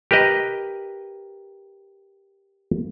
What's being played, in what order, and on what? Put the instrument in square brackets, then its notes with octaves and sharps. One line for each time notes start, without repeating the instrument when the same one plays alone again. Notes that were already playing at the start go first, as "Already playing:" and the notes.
[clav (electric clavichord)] G4 A#4 B4 D#5